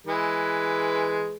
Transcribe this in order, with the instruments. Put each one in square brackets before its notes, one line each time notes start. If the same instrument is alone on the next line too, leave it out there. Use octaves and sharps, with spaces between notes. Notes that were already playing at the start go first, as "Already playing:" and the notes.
[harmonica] E3 G#3 B4